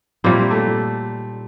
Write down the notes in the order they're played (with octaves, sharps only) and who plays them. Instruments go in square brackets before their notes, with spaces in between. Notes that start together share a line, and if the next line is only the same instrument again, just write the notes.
[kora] A#2 G3 A#3 E4 [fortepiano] C4
[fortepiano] A3